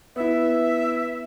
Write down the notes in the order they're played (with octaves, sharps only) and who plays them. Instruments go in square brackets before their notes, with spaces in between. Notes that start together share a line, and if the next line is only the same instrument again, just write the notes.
[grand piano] B3 E4 [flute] E5